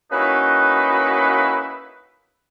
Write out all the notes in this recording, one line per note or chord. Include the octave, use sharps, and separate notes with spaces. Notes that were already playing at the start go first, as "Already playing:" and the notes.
A#3 C#4 D#4 E4 F#4 B4